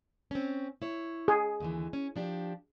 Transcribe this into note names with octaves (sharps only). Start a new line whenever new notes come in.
C4 C#4
E4 C#5
G#4
D#2 D3 E3
C#4
F3 D4 G4